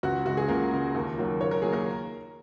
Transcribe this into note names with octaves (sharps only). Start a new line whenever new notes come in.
C#2 F#4 F#5
C#3 G#3 F#4
G#4
C#2 A#3 A#4
C#3 G#3
D#2
D#3 F#3 A#3
D#2 C#5
A#4
D#3 F#3 A#3 G#4
A#3 A#4